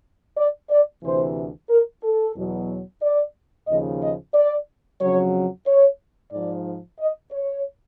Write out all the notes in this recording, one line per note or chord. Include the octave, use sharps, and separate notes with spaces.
D5
D5
D2 C3 E3 C5
A#4
A4
E2 B2 F#3
D5
D#2 C#3 F3 D#5
D#5
D5
F2 C#3 F#3 C#5
C#5
G#2 F3 D5
D#5
C#5